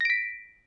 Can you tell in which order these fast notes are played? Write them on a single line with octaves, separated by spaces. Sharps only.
A#6 D7 B6